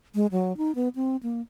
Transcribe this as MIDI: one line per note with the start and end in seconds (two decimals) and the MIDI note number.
0.15 0.27 56
0.31 0.56 54
0.57 0.74 63
0.75 0.89 59
0.96 1.16 60
1.23 1.41 58